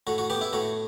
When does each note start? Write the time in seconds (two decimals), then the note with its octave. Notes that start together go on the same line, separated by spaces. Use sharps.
0.07 A2 F#4
0.18 F#4
0.30 B3 G4
0.41 E4
0.53 A2 F#4